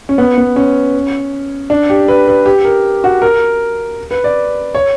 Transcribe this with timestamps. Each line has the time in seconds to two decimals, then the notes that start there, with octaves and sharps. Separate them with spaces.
0.09 C#4
0.18 B3
0.38 B3
0.56 C#4
1.70 D4
1.90 G4
2.08 B4
2.27 B4
2.46 G4
2.65 A#4
3.04 F#4
3.22 A#4
4.11 B4
4.24 D5
4.75 C#5